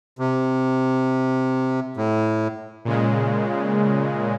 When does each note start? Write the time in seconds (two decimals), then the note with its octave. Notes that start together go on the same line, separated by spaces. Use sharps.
0.19 C3
1.97 A2
2.85 A#2 C#3 G#3